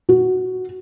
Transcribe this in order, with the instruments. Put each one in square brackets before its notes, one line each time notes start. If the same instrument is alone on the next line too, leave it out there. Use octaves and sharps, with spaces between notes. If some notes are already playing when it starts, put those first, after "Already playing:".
[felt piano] F#4